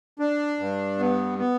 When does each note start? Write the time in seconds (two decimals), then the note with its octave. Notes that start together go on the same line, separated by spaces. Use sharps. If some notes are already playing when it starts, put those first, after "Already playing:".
0.19 D4
0.59 G2
0.99 B3
1.39 B3